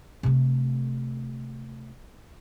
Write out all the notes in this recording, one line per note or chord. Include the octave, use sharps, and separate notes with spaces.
C3 A3